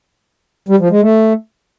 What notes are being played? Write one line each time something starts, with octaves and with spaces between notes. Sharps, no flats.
G3
F3
G#3
A3